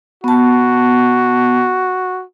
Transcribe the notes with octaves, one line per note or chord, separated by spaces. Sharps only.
B3 F#4 A5